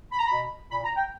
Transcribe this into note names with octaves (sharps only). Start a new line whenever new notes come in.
B5
A#5
B2 B5
A#2 B5
A#5
G5